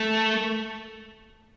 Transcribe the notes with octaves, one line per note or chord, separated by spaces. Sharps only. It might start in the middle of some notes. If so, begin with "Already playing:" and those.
Already playing: A3